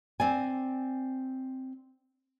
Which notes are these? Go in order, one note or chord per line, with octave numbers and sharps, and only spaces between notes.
C4 D5 G#5